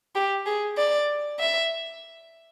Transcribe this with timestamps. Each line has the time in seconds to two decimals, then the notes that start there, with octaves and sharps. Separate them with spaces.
0.15 G4
0.46 G#4
0.78 D5
1.39 E5